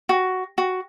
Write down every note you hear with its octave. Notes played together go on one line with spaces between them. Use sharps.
F#4
F#4